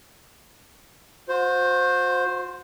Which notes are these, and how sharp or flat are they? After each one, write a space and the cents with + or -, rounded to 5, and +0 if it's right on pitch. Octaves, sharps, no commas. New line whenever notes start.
F#4 -45 C5 +0